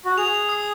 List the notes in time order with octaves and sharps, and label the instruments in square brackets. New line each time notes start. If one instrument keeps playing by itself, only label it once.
[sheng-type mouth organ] F#4
[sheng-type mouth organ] G#4 [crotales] F7
[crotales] F7
D#6